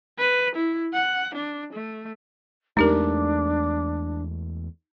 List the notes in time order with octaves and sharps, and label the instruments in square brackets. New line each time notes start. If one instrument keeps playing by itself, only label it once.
[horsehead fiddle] B4
E4
F#5
D4
A3
[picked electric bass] E2 G#3 A3 [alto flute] D4 [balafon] D#4 G4 A#4